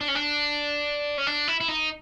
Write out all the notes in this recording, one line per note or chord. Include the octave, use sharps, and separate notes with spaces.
D4
C#4
D4
C#4
D4
E4
E4
D#4